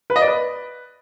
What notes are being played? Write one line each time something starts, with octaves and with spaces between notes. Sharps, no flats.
B4
D#5
D5
B4